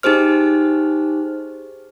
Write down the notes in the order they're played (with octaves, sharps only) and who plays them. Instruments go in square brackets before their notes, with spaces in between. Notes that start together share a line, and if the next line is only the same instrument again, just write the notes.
[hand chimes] D#4 G4 G#4 C5 F6